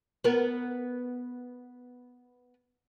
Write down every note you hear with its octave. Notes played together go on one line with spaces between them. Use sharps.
B3 A#4